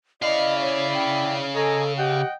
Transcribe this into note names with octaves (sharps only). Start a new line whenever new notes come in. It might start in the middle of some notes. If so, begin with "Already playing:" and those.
C#3 E4 D5 D#5 F5 B5
C#5
G5
A4 D#5 G#5 A#5
G4 D#5 F#5 G5